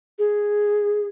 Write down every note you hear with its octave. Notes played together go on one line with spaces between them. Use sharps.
G#4